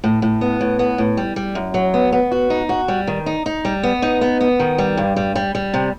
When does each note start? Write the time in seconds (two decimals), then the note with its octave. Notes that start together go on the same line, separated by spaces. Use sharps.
0.04 A2
0.22 A2
0.41 B3
0.61 A2
0.79 B3
0.98 A2
1.17 G3
1.36 G3
1.55 F#2
1.74 F#3
1.94 B3
2.12 B3
2.32 F#4
2.50 D#4
2.69 F#4
2.88 G3
3.07 D#3
3.26 D#4
3.46 D#4
3.65 G3
3.83 B3
4.02 D#4
4.21 B3
4.41 B3
4.60 D#3
4.78 G3
4.97 G2
5.16 G3
5.35 G3
5.55 G3
5.74 C3